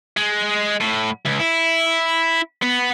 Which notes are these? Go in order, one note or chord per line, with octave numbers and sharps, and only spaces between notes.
G#3
A2
C#2
E4
B3